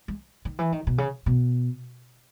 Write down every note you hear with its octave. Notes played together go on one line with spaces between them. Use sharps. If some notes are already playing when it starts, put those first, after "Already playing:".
G#3
D#3
E3
D#3
B2
C#3
B2